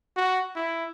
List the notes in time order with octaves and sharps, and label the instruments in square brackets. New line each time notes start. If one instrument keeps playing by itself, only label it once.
[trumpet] F#4
E4